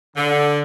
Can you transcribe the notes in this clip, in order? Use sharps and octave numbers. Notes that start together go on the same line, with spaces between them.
D3